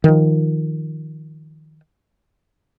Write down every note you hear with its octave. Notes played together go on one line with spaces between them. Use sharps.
D#3 F3